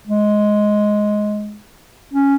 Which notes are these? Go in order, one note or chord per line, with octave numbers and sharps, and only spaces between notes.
G#3
C#4